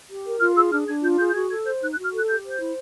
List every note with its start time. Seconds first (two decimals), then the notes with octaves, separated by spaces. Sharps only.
0.08 G4
0.24 A#4
0.39 F4 F6
0.55 G#4 E6
0.70 D4 F6
0.86 D4 G#6
1.02 F4 G6
1.17 G#4 G6
1.28 G6
1.33 F#4 G#6
1.49 A4 G#6
1.65 C5 G6
1.80 D#4 F#6
1.92 F#6
1.97 F#4
2.04 F6
2.12 A4 F#6
2.27 G4 G6
2.43 C5
2.51 G6
2.59 E4